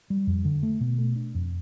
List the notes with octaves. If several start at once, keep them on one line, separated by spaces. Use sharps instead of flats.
G3
F2
D3
A3
B2
A3
D4
F2